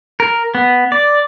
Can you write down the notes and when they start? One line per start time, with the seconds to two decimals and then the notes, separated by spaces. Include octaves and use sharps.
0.20 A#4
0.55 B3
0.92 D5